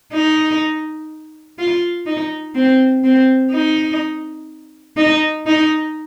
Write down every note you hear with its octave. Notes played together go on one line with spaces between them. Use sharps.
D#4
F4
D#4
C4
C4
D#4
D#4
D#4